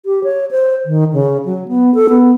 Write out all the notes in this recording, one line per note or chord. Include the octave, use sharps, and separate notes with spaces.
G4
C#5
C5
D#3
C#3
F#3
B3
A4
B3